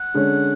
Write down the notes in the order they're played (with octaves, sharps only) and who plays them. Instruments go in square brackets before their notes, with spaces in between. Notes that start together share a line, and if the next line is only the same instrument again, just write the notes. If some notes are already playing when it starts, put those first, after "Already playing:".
Already playing: [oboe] F#5
[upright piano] D3 G#3 C#4